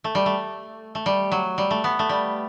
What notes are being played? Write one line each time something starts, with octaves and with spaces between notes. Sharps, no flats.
A3
G3
A3
A3
G3
F#3
G3
A3
B3
A3
G3